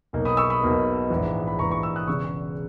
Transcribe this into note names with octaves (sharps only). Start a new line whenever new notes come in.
B1 B2 A#3 D#4
B5 D#6
C#6 E6
B5 D#6
B1 B2 A#3 D#4
A#1 G#2 E3
B5
A#1 G#2 E3 A#5 C#6
A#5 C#6
C#6 E6
D#6 F#6
E1 E2 C#3 C#6 E6